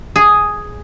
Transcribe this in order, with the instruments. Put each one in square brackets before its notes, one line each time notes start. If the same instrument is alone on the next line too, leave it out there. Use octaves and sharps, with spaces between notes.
[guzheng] G#4